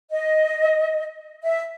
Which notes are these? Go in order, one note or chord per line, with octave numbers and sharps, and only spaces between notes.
D#5
E5